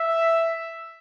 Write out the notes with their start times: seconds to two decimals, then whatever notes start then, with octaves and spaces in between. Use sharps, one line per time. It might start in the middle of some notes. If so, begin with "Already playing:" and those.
Already playing: E5